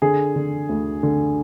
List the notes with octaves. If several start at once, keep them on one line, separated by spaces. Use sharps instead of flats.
D3 G#4
D3
D2
D3